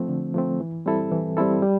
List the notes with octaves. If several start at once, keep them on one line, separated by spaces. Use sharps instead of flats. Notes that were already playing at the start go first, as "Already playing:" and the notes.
Already playing: F3 A3 C4
D3
F3 A3 C4
E3
G3 C4 E4 A4
E3
G3 C4 E4 A4
G3